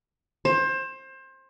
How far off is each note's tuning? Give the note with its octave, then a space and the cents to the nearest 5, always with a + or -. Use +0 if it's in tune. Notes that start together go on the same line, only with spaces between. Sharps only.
C5 +25